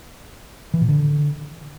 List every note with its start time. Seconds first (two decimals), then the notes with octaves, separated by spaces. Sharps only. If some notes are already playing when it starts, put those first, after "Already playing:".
0.74 E3
0.81 A#2
0.88 D3